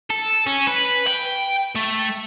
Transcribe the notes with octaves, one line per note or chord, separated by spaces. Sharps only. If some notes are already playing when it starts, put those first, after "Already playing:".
A4
C#4
B4
G5
A3